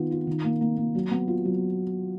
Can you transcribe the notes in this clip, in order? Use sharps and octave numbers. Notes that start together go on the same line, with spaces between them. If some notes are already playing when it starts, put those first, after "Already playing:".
Already playing: D#3 B3 F4
F4
D#3
A#3
A#3
A#3
F#3
B3
F4
F#3